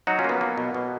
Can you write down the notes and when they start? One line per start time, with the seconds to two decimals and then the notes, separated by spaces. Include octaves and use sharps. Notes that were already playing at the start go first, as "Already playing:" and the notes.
0.07 F#3 D#4 F#4
0.19 C#4 F4
0.24 A#3 B3
0.41 A#3
0.58 B2
0.74 B2